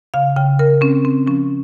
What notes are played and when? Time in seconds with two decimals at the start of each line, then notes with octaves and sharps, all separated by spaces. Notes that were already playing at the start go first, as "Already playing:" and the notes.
0.14 C#3 F5
0.36 C#3 G5
0.59 C#3 A#4
0.81 C4 C#4
1.05 C4
1.27 F3 C#4